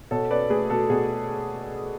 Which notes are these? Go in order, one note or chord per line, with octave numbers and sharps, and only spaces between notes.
B2 A4 C#5
C#4 B4 D5
A3 G#4 B4
B2 F#4 A4
B2 G#4